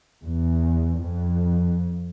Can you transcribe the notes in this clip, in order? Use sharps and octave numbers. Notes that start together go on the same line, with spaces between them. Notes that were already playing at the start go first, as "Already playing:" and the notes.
E2
F2